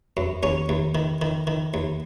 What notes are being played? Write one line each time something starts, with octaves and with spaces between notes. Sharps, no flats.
F#2
D#2 C#4
D#2
D#3
D#3
D#3
D#2